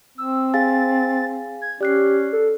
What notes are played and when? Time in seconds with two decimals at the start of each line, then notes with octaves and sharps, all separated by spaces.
0.18 C4 E6
0.54 G#4 F5 G#5 A6
1.62 G#6
1.81 C#4 G4 D5 F#6 C7
2.33 A4